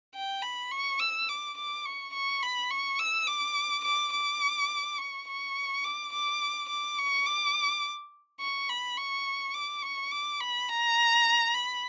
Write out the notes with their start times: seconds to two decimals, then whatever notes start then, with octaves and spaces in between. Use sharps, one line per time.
0.15 G5
0.42 B5
0.71 C#6
1.00 E6
1.29 D6
1.58 D6
1.86 C#6
2.13 C#6
2.43 B5
2.71 C#6
2.99 E6
3.27 D6
3.85 D6
4.13 D6
4.98 C#6
5.27 C#6
5.84 D6
6.13 D6
6.69 D6
6.98 C#6
7.26 D6
8.40 C#6
8.69 B5
8.97 C#6
9.54 D6
9.83 C#6
10.11 D6
10.40 B5
10.69 A#5
11.54 B5